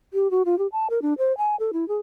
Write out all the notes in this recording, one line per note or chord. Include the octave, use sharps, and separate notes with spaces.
G4
F#4
F4
G4
A5
A#4
D4
C5
G#5
A4
E4
G#4